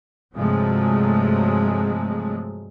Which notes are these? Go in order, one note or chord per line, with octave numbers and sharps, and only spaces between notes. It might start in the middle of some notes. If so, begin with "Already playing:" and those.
G2 C3 F3 F#3 G#3 A3